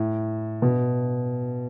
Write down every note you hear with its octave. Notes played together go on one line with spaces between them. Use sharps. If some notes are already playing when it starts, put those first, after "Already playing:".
Already playing: A2
B2